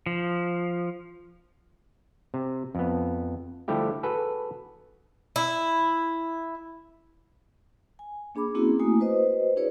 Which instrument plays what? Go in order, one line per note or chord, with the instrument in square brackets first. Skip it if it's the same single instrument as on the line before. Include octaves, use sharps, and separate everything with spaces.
[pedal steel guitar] F3
[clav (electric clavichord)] C3
F2 B3
D3 F3 G3 A3 E4 G4
F#4 G#4 A4 B4
[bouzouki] E4
[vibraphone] G#5
A#3 D4 G#4 B5 D6
A#3 C4 C#4 E4 F#4 G#4
A3 A#3 E4 F#4 G#5 D#6
F#4 B4 C5 D#5
D4 E4 G#4 B4 C#5 D5